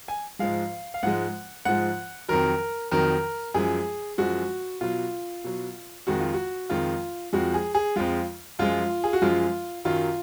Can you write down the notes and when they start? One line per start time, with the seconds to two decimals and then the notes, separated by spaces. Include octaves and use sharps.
0.08 G#5
0.39 G#2 F3 G#3 F5
0.94 F5
1.03 G#2 F3 G#3 F#5
1.65 G#2 F3 G#3 F#5
2.29 F2 D#3 F#3 A#4
2.91 F2 D#3 F#3 A#4
3.54 F#2 F3 G#3 G#4
4.18 F#2 F3 G#3 F#4
4.81 B2 F#3 F4
5.44 B2 F#3
6.07 F2 D#3 G#3 F#4
6.20 F4
6.34 F#4
6.70 F2 D#3 G#3 F4
7.33 F2 F3 G#3 F#4
7.54 G#4
7.75 G#4
7.96 F2 F3 G#3 F4
8.59 F#2 F3 G#3 F4
9.04 G#4
9.13 F#4
9.22 F#2 F3 G#3 F4
9.85 F#2 D#3 F#3 F4